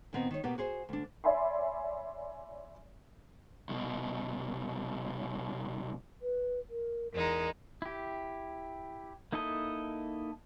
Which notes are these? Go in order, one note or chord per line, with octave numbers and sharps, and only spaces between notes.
A#2 D#3 B3 C4 D#4
D#3 C#5
B2 A#3 B3 G4
F#4 G#4 C5
D2 D4
C#5 D5 E5 G#5 B5 C6
C2 B2
B4
A#4
E2 G#3 D#4 A#4
E4 G4
A#3 D#4 E4 A4 D#5